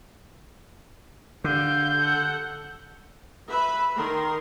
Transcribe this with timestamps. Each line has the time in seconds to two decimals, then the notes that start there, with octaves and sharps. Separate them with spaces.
1.44 D3 G4 F5 G6
1.96 A4 F#5
3.48 B4 E5 B5
3.96 D#3 A#4 C6